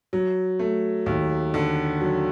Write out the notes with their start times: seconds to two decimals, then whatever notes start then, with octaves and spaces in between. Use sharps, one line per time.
0.13 F#3
0.59 A3
1.06 D#2
1.54 D3
2.01 F#3